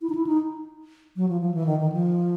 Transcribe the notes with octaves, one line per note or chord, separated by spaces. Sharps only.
E4
D#4
E4
D#4
F#3
F3
F3
E3
D#3
D#3
F3